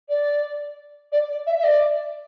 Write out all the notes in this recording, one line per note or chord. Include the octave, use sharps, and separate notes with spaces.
D5
D5
D5
E5
E5
D5